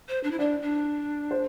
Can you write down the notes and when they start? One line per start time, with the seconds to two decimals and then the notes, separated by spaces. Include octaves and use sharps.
0.09 C5
0.24 D4
0.31 E4
0.39 D4 D5
0.62 D4
1.31 C5